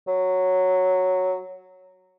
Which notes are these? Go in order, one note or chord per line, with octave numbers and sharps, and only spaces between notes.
F#3